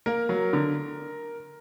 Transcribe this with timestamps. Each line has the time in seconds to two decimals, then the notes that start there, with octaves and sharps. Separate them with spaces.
0.06 A#3 A#4
0.29 F#3
0.53 D3